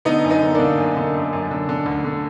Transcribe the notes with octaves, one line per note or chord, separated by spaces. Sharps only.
D3 B3 D#4
F#2
B3 D#4
D3
D3 A#3 D4
F#2
D3
F#2
F#2
D3
D3
D2
D3